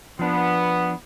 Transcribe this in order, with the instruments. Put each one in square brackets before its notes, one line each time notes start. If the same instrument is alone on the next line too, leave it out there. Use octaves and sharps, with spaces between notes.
[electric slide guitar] F3 D4 [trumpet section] B3